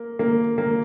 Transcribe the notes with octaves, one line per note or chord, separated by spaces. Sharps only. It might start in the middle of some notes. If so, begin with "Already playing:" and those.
Already playing: A#3
A#3
A#3